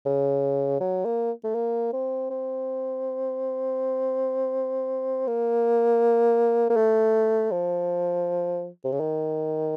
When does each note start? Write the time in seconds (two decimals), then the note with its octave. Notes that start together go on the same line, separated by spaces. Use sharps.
0.06 C#3
0.81 F#3
1.05 A#3
1.44 A3
1.55 A#3
1.93 C4
2.30 C4
5.27 A#3
6.70 A#3
6.76 A3
7.51 F3
8.84 C3
8.92 C#3
9.00 D#3